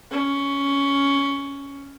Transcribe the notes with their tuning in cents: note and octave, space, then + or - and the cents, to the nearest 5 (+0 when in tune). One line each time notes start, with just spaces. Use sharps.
C#4 +10